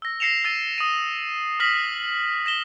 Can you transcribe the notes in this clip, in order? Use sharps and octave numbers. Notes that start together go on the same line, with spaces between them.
E6 A#6
A#6 C7 C#7 E7 F7
E6 A6 D#7
D#6 D#7
D#6 F6 A#6 B6 F#7
A#6 E7 G7